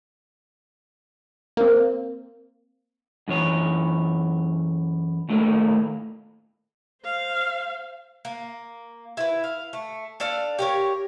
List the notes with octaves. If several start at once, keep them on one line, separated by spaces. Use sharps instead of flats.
A#3 C4
F#2 E3 C#5
D#2 A2 A3 A#3
C5 F5
A#3
E4 B4
F5
A3
D4 A4 D5 F5
G4 A#4 C#5